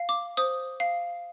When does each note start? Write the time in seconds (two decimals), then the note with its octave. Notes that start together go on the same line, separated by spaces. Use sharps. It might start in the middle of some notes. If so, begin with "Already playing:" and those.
Already playing: F5
0.09 D6
0.37 C5 D#6
0.80 F5